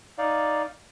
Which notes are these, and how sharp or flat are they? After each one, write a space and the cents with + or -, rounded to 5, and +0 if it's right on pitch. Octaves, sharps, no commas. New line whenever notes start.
D#4 +0 D5 +0 F5 +0